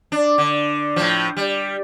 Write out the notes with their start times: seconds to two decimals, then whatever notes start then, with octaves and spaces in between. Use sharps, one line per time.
0.12 D4
0.38 D3
0.96 A2 F3
1.37 G3